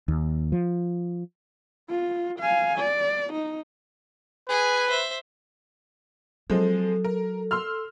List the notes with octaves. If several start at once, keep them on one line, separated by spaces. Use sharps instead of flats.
D#2
F3
F4
F5 G#5
D5
D#4
G#4 B4 G#5
C5 E5
F3 F#3 G#3 C4 A4
A#4
C6 E6 F6